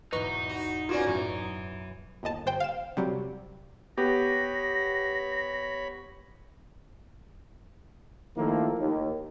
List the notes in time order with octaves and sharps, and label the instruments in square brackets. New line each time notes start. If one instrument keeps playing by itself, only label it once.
[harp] E2 G#2 B2 [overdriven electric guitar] D#4 [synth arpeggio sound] B4 D#5 C#6
[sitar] F#4
[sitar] A#3 B3 C#4 [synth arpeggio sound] F4 F#4 D5
[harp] F#2 [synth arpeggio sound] A2 F#4 [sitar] E3
[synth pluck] G1 D#2 D#5 A5
G1 C5 G5
F5 E7
C3 F#3 G3
[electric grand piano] B3 G4 [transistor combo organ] C#5 B5 [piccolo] A#6
[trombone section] D#3 F3 A3 A#3 E4 A4
D#2